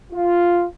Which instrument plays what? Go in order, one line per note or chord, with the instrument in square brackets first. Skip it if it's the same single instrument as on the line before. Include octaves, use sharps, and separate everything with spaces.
[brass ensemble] F4